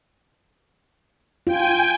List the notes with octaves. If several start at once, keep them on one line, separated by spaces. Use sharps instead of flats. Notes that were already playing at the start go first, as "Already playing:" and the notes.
F4 G5 G#5